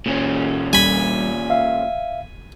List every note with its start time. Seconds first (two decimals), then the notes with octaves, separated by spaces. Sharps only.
0.06 A#2 C#4
0.73 G3 G#5 B5
1.50 E5 F5